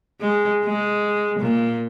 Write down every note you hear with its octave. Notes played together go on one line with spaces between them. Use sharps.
G#3
G#3
A#2